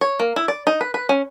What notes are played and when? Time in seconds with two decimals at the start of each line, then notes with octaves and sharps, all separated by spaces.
0.01 C#5
0.20 A#3
0.36 E4
0.48 D5
0.67 D#4
0.81 B4
0.94 B4
1.09 C#4